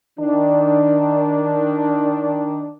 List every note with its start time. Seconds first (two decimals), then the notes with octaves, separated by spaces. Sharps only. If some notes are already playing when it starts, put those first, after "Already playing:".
0.19 D#3 D4